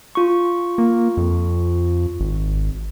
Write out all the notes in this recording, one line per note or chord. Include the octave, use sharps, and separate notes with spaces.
F4 C#6
A#3
F2
G#1